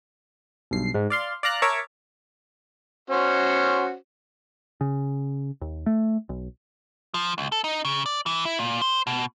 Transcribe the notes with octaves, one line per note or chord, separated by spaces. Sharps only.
B1 G2 C7
G#2
D5 F5 C6
D5 F5 A#5 F#6
A#4 C#5 E5 A5 D6
C#4 F#4 C5
C#3
D#2
A3
B1
F3
C#2
A4
D#4
C#3
D5
E3
E4
A#2
C5
B2